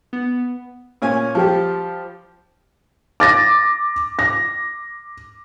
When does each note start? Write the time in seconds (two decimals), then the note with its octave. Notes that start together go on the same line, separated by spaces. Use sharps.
0.13 B3
1.02 A#2 C#4 G#5
1.35 F3 G3 G4
3.20 D6 A6 A#6
4.19 A#6